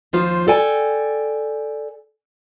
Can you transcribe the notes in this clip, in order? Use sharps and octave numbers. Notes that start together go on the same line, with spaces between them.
D#2 F3 F4 C5
A4 D5 G5 G#5